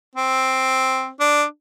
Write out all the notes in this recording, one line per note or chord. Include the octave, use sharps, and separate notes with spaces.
C4
D4